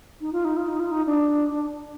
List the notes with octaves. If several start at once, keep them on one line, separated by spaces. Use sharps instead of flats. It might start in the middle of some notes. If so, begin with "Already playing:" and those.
D#4
F4
D#4
F4
D#4
F4
D#4
D4